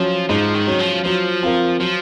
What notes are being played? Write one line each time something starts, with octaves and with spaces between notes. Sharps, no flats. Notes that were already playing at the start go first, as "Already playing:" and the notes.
Already playing: F3 F#3 C#4
G#2 F3
D#3
F#3 C#4
F3
F3 F#3
C4 F4 A#4
F3 F#3